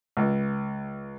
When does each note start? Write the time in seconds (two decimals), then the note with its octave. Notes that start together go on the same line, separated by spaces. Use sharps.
0.17 C#2